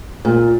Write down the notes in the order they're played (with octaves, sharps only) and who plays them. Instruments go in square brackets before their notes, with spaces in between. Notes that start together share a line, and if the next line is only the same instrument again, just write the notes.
[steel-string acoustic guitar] A#2